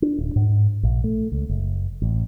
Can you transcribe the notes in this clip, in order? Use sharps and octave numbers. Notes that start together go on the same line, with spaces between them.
D4
D1
G#2
A#1
A3
C#2
F#1
A1